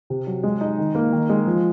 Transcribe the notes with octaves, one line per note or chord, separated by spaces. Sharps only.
C3
F#3
G#3
D#4
D#3
A#3
D#3
G#3
F3